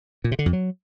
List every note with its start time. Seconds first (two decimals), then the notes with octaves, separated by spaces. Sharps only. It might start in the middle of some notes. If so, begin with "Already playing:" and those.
0.24 A#2
0.32 C3
0.39 D3
0.46 F2
0.53 F#3